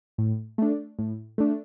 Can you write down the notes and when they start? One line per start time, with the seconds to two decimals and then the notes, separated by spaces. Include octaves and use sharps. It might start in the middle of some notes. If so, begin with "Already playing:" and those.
0.18 A2
0.58 A3 D4
0.99 A2
1.38 A3 D4